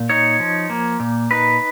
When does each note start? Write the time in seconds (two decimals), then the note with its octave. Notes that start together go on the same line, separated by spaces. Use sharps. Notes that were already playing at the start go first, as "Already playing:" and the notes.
Already playing: A#2
0.09 D#4 C#5
0.39 F3
0.70 A#3
1.00 A#2
1.31 D#4 B4